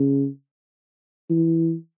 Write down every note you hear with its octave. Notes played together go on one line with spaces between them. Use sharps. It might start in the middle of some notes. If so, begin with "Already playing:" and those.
Already playing: C#3
E3